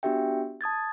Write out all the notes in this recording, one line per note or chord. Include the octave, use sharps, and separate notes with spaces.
B3 D4 F#4 G4 E5 G5
A5 D#6 G#6 A6